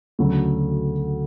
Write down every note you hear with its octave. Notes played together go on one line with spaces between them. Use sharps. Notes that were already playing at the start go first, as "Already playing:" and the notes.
D2 C#3 F#3 A3